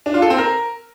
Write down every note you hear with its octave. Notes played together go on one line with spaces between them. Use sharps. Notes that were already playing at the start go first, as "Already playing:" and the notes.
D4
F4
A4
C4
A#4